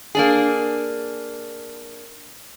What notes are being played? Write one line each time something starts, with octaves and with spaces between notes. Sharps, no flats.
A#3 D4 G#4